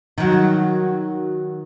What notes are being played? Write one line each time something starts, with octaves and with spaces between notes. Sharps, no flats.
D#3 F#3